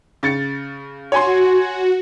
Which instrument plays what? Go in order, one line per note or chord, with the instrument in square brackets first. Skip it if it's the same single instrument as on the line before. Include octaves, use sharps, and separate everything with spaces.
[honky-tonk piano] C#3 A6 C#7
[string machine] F#4 [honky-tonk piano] C#5 G#5 C6